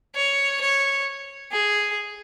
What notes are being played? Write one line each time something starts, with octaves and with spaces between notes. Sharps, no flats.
C#5
C#5
G#4